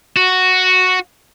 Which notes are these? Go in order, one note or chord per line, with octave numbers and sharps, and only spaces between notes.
F#4